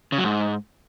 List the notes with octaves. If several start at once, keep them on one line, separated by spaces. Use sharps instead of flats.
C#3
F#3
G#2